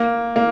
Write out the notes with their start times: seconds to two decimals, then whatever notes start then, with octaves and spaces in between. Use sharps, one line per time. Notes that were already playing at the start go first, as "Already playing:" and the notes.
Already playing: A#3
0.36 A#3